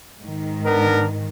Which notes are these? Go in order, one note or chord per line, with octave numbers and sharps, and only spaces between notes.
G#2 D#3
B3 D4 A#4